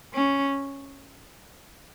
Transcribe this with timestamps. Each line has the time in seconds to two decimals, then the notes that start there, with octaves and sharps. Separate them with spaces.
0.14 C#4